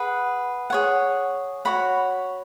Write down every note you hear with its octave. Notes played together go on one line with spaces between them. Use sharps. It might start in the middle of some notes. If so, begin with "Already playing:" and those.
Already playing: G#4 B4 F#5
G#4 C#5 F#5
F#4 C#5 F#5 B5